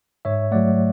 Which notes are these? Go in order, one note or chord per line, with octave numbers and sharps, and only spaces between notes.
G#2 C#5 E5
F#3 A3 D5 F#5